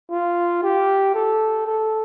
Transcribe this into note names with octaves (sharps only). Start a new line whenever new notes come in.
F4
G4
A4
A4